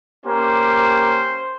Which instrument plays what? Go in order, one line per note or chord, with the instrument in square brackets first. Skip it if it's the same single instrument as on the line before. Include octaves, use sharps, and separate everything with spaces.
[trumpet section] A#3 C#4 G4 C5